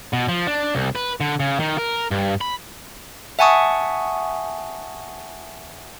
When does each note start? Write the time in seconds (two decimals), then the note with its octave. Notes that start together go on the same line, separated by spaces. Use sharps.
0.13 B2
0.29 F3
0.47 D4
0.75 C2
0.95 B4
1.20 D3
1.40 C#3
1.60 D#3
1.78 A#4
2.11 G2
2.41 B5
3.39 E5 F#5 G#5 A5 C#6 D#6